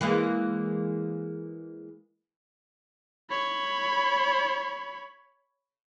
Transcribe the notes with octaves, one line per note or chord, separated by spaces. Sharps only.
E3 G#3 A#3
C#5 B5